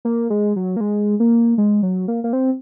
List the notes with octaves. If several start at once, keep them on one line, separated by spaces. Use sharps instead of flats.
A#3
G#3
F#3
A#3
G#3
A#3
G#3
F#3
A#3
A#3
C4